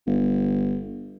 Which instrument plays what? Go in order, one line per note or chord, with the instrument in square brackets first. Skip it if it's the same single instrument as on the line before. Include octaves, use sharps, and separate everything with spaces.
[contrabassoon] G1